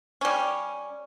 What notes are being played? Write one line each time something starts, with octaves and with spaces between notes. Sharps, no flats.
G3 C#4